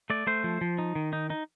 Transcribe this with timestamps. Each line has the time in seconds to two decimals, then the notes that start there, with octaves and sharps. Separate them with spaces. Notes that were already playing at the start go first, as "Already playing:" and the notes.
0.10 A3 D5
0.27 A3 C5
0.44 F3
0.61 F3
0.78 D#4
0.95 D#3
1.13 D#4
1.30 D#4